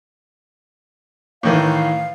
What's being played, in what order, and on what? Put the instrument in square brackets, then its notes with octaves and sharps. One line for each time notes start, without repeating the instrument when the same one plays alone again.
[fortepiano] A2 D#3 E3 [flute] F5